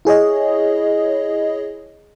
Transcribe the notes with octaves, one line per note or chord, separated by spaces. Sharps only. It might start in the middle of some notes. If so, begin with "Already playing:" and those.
E4 G#4 C#5 D#5